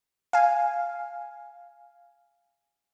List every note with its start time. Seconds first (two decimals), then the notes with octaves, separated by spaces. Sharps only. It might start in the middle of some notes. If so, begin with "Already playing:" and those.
0.33 F5 G#5